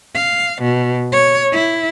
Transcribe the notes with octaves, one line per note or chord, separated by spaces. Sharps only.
F5
B2
C#5
E4